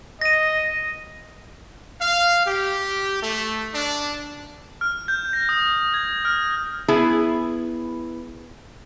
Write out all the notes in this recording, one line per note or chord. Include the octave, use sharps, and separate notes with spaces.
D#5 A#6 D#7
F5
G4
A3
D4
F6
G6
A#6
D#6
G#6
F6
B3 E4 G#4